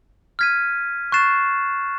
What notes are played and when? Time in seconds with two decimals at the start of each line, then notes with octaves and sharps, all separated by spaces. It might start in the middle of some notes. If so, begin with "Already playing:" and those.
0.39 F6 G#6 B6 D#7
1.12 C#6 F#6 A6 C7 E7